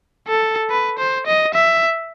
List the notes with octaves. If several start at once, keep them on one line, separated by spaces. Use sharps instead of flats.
A4
B4
C5
D#5
E5